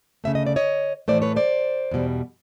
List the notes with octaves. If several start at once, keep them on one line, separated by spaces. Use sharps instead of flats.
D2 C#3 F3 A3 E5
D#5
D5
C#5 D#5
A2 E3 A3 C5 D5
B4 C#5
C5 D5
E2 B2 G3